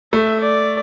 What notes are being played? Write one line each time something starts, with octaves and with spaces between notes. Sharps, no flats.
A3 E5
D5